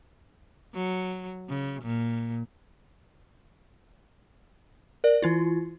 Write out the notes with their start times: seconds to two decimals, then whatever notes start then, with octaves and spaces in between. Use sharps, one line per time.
0.74 F#3
1.49 C#3
1.82 A#2
5.04 A#4 D5
5.22 E3 E4 F4